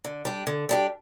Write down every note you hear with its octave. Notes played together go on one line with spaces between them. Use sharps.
D3
G3 D4 G4
D3
G3 D4 G4